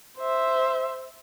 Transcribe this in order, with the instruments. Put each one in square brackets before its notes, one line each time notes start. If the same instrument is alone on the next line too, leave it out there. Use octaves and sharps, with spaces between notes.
[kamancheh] C5 E5